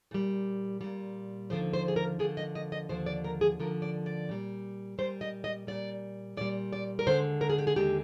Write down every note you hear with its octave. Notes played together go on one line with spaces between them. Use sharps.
A#2 G3
A#2 G3
D#2 D3 F3 C5
C5
G#4
A#4
D#2 D3 F3 G#4
D#5
D#5
D#5
D#2 D3 F3 C5
D5
A#4
G#4
D#2 D3 F3 A#4
D5
D5
A#2 G3
A#2 G3 C5
D#5
D#5
A#2 G3 D5
A#2 G3 D5
D5
A#4
D#2 D3 G#3 C5
A#4
G#4
G4
G#4
D#2 D3 G#3 G4